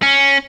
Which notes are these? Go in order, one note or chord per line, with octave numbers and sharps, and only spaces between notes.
C#4